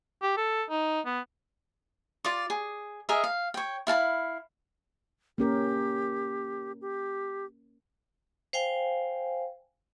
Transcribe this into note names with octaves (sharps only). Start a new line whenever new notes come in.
G4
A4
D#4
B3
F4 D5 D6
G#4
G#4 A#4 D#5 E5
F5
C#5 G5
E4 F5 A5 B5
A#3 C#4 G4 A#4
G4
C5 F5 G5 G#5